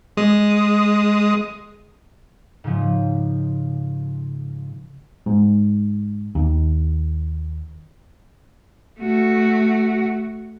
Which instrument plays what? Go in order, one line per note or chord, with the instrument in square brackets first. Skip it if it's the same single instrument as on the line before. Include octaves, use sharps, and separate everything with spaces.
[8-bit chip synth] G#3 D#6
[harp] G#2 C#3 F3
[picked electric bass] G#2
D#2
[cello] A3 F#4